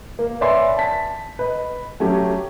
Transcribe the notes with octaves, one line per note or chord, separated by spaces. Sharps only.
A#3
B4 C#5 D5 E5 G#5 C6
A5 B6
B4 D#5
F#3 A3 C#4 G4